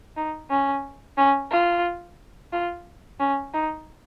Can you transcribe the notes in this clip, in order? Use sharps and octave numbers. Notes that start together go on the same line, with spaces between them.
D#4
C#4
C#4
F4
F4
C#4
D#4